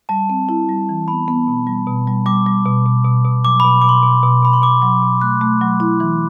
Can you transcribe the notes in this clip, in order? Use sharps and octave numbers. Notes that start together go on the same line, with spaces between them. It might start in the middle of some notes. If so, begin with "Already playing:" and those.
G3 A5
C4
E4
G3
E3
B3 B5
B3
B2
G3
B2
G3
G3 D6
G3
B2
B2
B2
B2
F#3 D6
B5
B2
D6
B2 C6
B2
B2
B2 B5
C6
B2 D6
F#3
B2
A3 F#6
A3
F#3
E4
E3